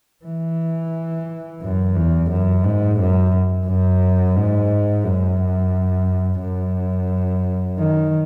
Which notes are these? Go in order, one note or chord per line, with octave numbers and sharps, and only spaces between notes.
E3
F#2
E2
F#2
G#2
F#2
F#2
G#2
F#2
F#2
D#3